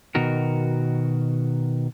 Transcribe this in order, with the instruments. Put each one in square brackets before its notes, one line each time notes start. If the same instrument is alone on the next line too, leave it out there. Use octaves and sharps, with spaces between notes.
[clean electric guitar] B2 D#3 F#4 A#4